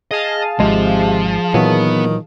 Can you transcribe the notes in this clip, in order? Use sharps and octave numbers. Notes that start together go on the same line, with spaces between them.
G#4 D#5 F5 A5
G#1 C3 F3 G#3
A#2 D#3 E3 F#3 B3